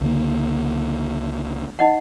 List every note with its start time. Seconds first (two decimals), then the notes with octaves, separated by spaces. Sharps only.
0.01 C#2 D3 A#3
1.79 D#4 D#5 F#5